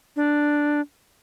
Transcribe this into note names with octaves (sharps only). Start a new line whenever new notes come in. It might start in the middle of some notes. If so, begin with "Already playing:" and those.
D4